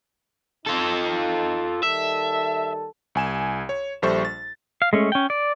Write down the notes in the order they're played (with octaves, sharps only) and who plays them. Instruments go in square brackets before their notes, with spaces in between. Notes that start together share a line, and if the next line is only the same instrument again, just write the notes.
[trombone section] F2 D#4 [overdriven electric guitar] F4 A4
[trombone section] D#3 G3 A4 [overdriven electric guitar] E5
[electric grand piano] C2 G#5 E7
C#5
A#1 G3 A4 C5 E5 C#6
A6
[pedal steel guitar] F5
G#3 A3 C#4
C#4 G5
D5